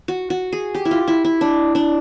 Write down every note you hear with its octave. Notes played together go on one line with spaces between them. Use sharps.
F#4
F#4
G#4
G4
E4
F4
E4
E4
D4
D4